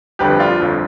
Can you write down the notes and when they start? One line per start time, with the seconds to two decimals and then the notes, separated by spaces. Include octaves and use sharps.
0.19 G1 F2 D3 G4 B4
0.39 D4 F4
0.60 G1 F2 D3